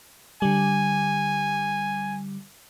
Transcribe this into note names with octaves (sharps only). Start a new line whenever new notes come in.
D3 G3 G#5